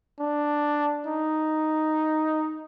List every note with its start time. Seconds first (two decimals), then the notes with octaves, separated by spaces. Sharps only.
0.20 D4
1.06 D#4